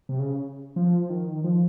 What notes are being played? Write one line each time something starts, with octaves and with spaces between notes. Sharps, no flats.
C3
C#3
F3
D#3
F3